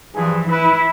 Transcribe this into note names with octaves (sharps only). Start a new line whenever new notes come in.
G2 E3 F3 F4 G#4
E4 B4